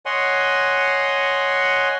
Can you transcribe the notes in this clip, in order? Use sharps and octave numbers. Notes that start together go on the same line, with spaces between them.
C#5 D#5 F#5 G#5 C6